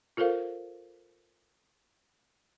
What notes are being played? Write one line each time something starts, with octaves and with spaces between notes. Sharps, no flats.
F4 A4 A#4 C5 F5